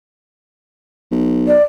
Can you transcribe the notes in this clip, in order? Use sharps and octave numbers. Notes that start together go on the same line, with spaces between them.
B1
D5